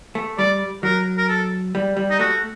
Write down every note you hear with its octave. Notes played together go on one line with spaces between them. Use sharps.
A3
G3 D5
F#3 A#4
A#4
A4
G3
G3
D#4
A3 F#4